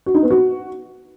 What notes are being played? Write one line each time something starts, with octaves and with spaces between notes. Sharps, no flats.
F#4
D#4
B3
F#4